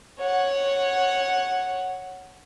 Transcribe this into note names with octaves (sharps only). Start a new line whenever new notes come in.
C#5 F#5